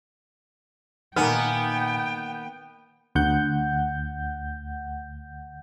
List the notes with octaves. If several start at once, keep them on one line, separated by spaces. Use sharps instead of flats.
A#2 D#3 A#3 B3 G5 G#5 F6
D2 F#5 G6